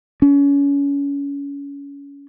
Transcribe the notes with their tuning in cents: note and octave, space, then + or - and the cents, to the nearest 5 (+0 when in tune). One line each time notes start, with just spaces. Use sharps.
C#4 +30